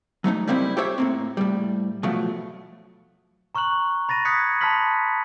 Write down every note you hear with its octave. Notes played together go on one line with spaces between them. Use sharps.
F#3 A3 C#4 D#4
G3 A#3 C4 D#4 E4
G4 A4 C5 C#5 E5
A2 A#3 C4
A2 G3
B2 F3 F#3 A3
A#5 C#6 F6 F#6 F#7
B5 A6 A#6 D#7
D#6 F#6 G#6 B6 C#7
A5 B5 C6 F6 B6 F#7